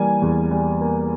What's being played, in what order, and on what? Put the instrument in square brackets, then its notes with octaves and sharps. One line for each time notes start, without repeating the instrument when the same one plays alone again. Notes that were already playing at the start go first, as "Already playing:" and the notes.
Already playing: [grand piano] E3 G3 A#3 G#5
E2
G3
A#3